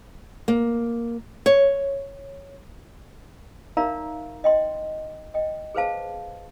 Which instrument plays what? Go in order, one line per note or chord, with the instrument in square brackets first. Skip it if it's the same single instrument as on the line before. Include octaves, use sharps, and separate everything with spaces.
[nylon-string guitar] A#3
C#5
[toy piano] D#4 A#4 D5 E5 F5 A#5
D#5 G5 C6
D#5 G5
G#4 B4 C5 F5 A5